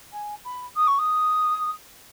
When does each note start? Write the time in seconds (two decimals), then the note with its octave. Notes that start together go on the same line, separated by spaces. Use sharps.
0.13 G#5
0.45 B5
0.75 D#6
0.87 C#6
0.99 D#6